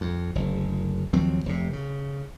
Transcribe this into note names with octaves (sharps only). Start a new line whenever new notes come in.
F2
F#1 D2
D#2 F3 F#3 C4
F1 G#2 C3
C#3